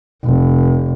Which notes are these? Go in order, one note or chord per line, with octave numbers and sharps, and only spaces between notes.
F1